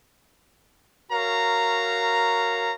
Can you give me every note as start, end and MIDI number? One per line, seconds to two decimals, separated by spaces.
1.12 2.73 66
1.12 2.73 70
1.12 2.73 73
1.12 2.73 77
1.12 2.73 82